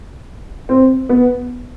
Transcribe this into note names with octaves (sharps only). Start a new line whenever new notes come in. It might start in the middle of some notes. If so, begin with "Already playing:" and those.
C4
B3